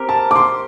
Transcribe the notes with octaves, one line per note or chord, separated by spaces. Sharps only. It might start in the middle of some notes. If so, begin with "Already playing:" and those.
Already playing: C4 G4 A#4
A5
D6
C6